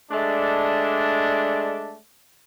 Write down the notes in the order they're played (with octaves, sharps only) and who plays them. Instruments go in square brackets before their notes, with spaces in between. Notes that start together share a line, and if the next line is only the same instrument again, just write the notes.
[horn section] G#3 A3 D4